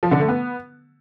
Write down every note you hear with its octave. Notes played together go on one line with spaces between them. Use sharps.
F3
D3
A3
B3